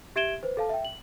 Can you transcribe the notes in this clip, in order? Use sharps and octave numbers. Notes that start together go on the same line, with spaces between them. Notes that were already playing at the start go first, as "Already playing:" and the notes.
G4 E5 G#6 D7 E7 G7
B4 C5
A4 F5 A5
E5 G5
F#7